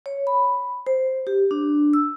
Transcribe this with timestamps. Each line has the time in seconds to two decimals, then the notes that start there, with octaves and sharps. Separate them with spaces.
0.06 C#5
0.27 B5
0.87 C5
1.27 G4
1.51 D4
1.93 E6